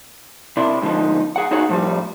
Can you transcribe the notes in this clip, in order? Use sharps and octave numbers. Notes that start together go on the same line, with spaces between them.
C3 D4 E4
G#2 D3 F3 D#4
G#4 F#5
D#4 F#4 G#4 C#5 F#5
A2 F3 G3